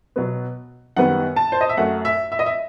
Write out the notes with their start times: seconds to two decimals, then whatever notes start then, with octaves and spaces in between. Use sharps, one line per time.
0.16 B2 F#3 B3
0.97 F#2 D#3 G3 B3 F#5
1.36 A5
1.52 C5
1.61 D#5
1.69 E5
1.77 F#2 F#3 A3 F#5
2.05 E5
2.32 E5
2.39 D#5
2.46 E5